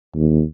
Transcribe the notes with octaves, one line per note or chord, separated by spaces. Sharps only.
D#2